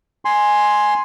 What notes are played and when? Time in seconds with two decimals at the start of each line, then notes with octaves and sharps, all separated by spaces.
0.25 G#5 C6